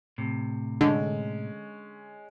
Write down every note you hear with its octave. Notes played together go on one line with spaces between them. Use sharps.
A2 C3
D3 G#3 C#4